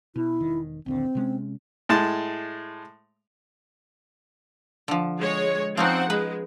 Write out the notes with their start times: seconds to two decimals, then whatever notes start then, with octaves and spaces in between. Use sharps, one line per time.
0.16 B2 E4
0.40 E1 D#3
0.86 A#1 D#2 D3 C4
1.15 C3 G#3 C#4
1.89 A2 G#3 A5
4.88 D3 F3
5.18 G#3 C#5
5.77 F3 C4 C#4 D#4 F#5
6.10 G#3 B4